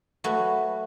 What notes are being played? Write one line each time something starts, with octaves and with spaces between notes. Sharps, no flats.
F#3 A3 F#4 B4